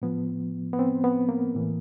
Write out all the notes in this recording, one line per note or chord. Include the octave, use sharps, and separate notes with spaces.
A2 F3 B3
B3
C4
B3
A#3
A2 E3